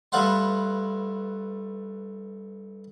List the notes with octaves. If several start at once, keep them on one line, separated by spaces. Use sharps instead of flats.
G2 A3 B4 F5 F#5 C6